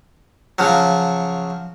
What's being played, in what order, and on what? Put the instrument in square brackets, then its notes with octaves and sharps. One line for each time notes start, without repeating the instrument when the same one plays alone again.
[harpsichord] C#3 F3 F#3